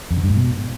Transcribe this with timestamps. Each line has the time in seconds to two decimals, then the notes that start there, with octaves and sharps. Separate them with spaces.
0.11 F2
0.17 D3
0.24 G2
0.30 G#2
0.37 B2